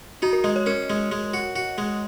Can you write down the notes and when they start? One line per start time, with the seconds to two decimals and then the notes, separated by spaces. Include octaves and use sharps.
0.22 D#4 F#4
0.33 A#4
0.44 G#3 D#5
0.56 C#5
0.66 C#4 A#4
0.90 G#3
1.12 G#3
1.34 F#4
1.56 F#4
1.78 G#3